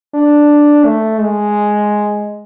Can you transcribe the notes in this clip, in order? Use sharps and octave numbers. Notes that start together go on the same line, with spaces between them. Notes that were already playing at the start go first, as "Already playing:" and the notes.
D4
A3
G#3